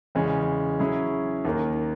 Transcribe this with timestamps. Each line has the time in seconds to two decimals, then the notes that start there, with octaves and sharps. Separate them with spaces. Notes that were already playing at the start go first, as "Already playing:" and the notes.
0.15 E2 C#3 G#3 C#4
0.80 F#3 C#4 E4 G#4
1.45 D#2 D#3 A#3